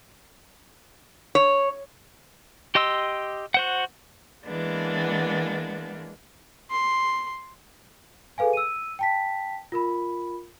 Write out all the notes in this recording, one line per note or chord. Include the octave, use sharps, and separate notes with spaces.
C#5
G4 D#5 C6 E6
F#4 C5 F#5
E3 G#3 A#3 B3 D4
C6
G#4 A4 B4 F5 G#5
E6 D#7
G5 A5 B6
F4 A#4 B5